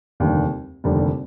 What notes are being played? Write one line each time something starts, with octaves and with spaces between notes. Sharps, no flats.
F1 D#2 D3 G3
F1 D#2 D3 G3